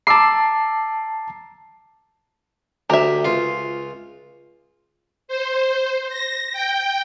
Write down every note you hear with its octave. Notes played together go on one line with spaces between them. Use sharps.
A5 A#5 D6 E6 C7
D2 G4 E5 A#5
C#2 F4
C5
A#6
G5